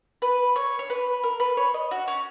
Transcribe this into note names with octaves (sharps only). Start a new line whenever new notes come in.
B4
C#5
C#5
B4
A#4
B4
C#5
D#5
F#4
C#4